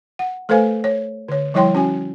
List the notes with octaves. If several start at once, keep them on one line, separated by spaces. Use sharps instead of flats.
F#5
A3 A4 B4 C5 F5 G#5
C#5
D3 C#5
F3 G3 E4 C#5 G5 C6
C#4 F#4 G#5